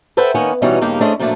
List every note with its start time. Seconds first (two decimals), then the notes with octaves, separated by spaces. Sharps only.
0.17 A4 B4 C5 E5 F#5 G5
0.35 D#3 A#3 B3 C#4
0.62 B2 E3 G3 C#4 D#4
0.81 G2 C#3 A#3 D#4 G4
1.01 A3 C#4 D4 G#4 C5 D#5
1.19 F#2 A#2 F3 A3 D4